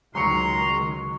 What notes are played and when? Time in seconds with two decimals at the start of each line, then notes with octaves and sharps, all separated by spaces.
0.15 C#2 D#3 F#3 G#3 A#5 C6 C#6 C#7